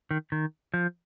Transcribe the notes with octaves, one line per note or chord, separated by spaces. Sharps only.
D#3
D#3
F3